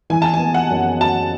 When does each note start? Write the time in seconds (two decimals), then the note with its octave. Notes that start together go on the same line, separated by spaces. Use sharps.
0.10 E3 G#5
0.22 A5
0.34 G#5
0.40 B3
0.54 F#5
0.70 F#2
1.00 F#4 A5